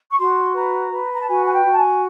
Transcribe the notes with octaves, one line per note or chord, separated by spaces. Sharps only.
C#6
F#4 C6
B4 A#5
B4
A#5
A5
F#4 G#5
G#5
G5
F#4
A5
G#5